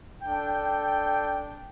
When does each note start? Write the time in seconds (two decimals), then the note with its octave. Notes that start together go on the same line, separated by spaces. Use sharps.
0.23 D4 A4 G5